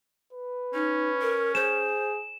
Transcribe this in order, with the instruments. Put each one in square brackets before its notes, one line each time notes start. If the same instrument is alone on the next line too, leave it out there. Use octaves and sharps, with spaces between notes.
[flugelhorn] B4
[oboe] C#4 [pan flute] D#4
[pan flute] A#4
[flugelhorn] G#4 [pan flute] C5 [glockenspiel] E7